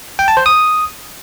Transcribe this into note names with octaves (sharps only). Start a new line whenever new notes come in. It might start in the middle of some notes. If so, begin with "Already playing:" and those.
G5
A5
C5
D#6